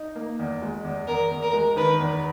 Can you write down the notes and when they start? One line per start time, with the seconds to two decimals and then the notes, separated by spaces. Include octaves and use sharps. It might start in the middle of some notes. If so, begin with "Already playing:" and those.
Already playing: D#4
0.15 A#3
0.39 E2
0.62 G#3
0.85 E2
1.07 E2 A#4
1.31 E2
1.42 A#4
1.53 G#3
1.76 D#3 B4
1.99 E2